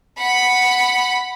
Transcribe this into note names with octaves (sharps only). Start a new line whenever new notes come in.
F#5 B5